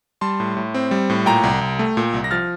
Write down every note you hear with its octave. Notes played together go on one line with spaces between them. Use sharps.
G3 A5 C6
A2
A2
C4
G3
A2
A#2 G5 A#5
C2
C2
A3
A#2
C2
A#6
F3 F6 A6